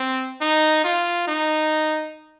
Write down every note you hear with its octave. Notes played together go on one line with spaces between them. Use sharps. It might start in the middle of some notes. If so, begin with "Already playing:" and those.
Already playing: C4
D#4
F4
D#4